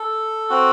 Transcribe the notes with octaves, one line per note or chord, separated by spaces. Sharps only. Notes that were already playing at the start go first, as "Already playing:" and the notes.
Already playing: A4
C4 F#4